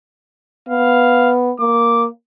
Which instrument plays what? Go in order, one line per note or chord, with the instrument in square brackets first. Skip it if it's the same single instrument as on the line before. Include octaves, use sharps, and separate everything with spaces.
[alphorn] B3 [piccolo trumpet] F5
[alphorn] A#3 [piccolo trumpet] D6